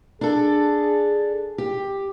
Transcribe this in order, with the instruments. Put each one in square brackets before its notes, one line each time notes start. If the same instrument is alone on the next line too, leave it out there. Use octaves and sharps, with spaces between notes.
[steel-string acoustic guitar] D4 A4 [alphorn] G#4
[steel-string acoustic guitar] G4